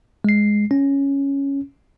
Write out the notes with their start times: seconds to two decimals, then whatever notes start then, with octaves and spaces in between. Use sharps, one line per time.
0.24 G#3 C7
0.71 C#4